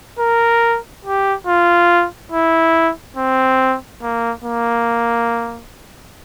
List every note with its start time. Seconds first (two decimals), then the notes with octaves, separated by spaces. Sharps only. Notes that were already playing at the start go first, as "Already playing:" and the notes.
0.19 A#4
1.05 G4
1.47 F4
2.32 E4
3.16 C4
4.02 A#3
4.44 A#3